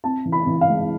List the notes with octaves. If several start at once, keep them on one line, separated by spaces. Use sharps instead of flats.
C4 A5
E3
B5
E3
F5
G#3